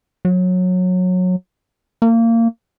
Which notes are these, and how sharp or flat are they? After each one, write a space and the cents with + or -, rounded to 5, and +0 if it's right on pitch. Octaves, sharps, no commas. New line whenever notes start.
F#3 -20
A#3 -25